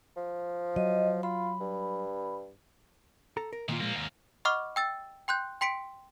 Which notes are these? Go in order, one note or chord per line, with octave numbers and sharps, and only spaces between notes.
F3
F#3 D#5
F4 B5
G2
A4 A5 A#5
A#4
A#2 D#3 A#3 F4
A#2 F3 G#3 A#3
D#2 G#2 A#3
D#5 F#5 B5 C#6 D6 F6
G5 E6 A6
G5 C6 F#6 G6
G5 C6 B6 C#7 D7